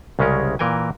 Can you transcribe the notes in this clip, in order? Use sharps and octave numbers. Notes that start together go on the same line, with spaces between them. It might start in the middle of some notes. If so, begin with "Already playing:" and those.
C2 C#3 G#3 C#4 A#4
A#2 E3 A#4 G5 G#5